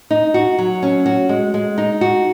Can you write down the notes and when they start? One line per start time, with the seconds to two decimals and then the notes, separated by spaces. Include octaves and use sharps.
0.11 D#4
0.34 F#4
0.58 F#3
0.83 C#4
1.06 F#4
1.29 G#3
1.54 G#3
1.78 D#4
2.01 F#4